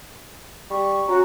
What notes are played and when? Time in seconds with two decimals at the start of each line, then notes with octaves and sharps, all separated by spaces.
0.70 G3 C#6
1.08 C#4 F#4 A#5